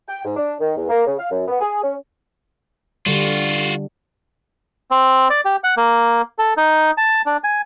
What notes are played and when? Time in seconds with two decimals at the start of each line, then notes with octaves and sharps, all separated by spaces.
0.08 G5
0.24 G#2
0.37 D4
0.60 D#3
0.76 E2
0.89 A#3
1.06 C#3
1.19 F5
1.30 F#2
1.48 B3
1.61 G#4
1.82 C#4
3.06 D3 G3 F4 F#4
4.91 C4
5.30 D5
5.45 G4
5.64 F#5
5.77 A#3
6.39 A4
6.57 D#4
6.98 A5
7.26 D4
7.44 G#5